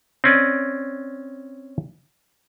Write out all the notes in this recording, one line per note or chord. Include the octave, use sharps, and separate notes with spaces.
C4 C#4 D5 D#5